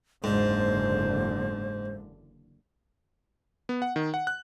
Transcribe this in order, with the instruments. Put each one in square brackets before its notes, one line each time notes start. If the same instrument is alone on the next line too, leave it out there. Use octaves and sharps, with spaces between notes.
[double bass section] F#1 E2 D3 [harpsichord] G#2 [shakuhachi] C5
[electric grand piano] B3
F#5
D#3
F#5
F#6